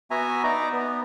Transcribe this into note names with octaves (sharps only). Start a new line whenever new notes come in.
B3 F#4 E5 G#5 A#5
D#4 D5 A#5
B3